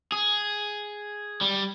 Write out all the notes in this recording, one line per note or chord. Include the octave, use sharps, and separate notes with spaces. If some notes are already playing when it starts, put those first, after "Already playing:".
G#4
G3